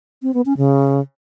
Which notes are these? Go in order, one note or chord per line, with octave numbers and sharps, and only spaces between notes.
C4
B3
C#4
C#3